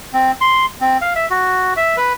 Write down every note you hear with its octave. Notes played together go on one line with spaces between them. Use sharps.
C4
C6
C4
F5
E5
F#4
E5
B4